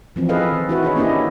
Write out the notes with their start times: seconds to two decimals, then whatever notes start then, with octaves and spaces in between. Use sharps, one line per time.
0.16 E3 F3 C4
0.29 G#4 A4 B4 D#5 F5
0.52 D#3
0.69 E4 F#4 B4
0.83 D#4 G#4 C#5
0.96 A#3 C#4 D4 E4 G4 D#5